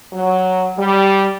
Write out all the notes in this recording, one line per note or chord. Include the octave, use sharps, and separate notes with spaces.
F#3
G3